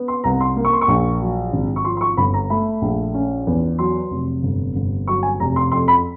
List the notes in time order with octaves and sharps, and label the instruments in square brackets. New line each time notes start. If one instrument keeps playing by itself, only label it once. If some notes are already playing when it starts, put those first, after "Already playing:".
Already playing: [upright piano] B3
C6
C2 A#5
C6
A#3
C#6
C6
C#6
A#1
F#3
G#1
C#6
F3 C6
C6
C#6
G1 B5
A#5
A3 B5
A#1
C#4
E2
F#3 C6
F1
G1
G1
F#3 C#6
G#5
F1 A#5
C6
F2 C6
B5